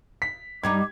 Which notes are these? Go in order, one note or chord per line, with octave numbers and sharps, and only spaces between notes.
B6
G2 G3 D#4 D#5 D6 G#6